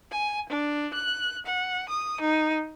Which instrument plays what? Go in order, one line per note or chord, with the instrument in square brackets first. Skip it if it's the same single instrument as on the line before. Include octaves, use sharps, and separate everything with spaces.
[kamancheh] G#5
D4
F#6
F#5
D#6
D#4